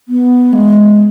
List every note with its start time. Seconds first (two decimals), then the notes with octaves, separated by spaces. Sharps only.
0.08 B3
0.53 G#3